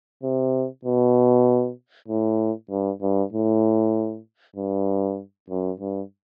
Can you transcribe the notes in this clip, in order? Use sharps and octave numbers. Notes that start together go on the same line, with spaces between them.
C3
B2
A2
G2
G2
A2
G2
F#2
G2